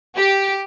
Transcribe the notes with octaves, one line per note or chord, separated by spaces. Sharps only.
G4